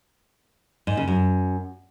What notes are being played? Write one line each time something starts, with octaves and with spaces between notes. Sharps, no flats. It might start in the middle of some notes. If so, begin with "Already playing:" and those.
G#2
C#3
F#2